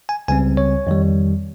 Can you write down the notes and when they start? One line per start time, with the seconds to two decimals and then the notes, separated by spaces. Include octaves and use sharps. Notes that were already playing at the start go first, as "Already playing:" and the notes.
0.09 G#5
0.28 C#2 C#3 G3 C4 G#5
0.57 C#5
0.87 F2 D#3 G3